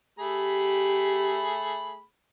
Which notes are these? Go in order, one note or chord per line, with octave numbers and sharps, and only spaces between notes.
A3 G4 G#4 B5